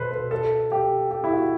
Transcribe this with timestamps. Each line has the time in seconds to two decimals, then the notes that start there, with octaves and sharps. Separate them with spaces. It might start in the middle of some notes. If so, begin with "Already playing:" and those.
Already playing: B2 A4 B4 C5
0.12 B4
0.31 A4
0.72 G4
1.11 G4
1.24 E4
1.33 F#4